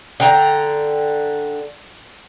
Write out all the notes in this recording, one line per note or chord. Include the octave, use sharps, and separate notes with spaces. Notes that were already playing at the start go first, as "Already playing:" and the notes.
D3 G5 A#5